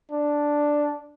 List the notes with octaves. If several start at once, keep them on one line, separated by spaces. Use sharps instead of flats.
D4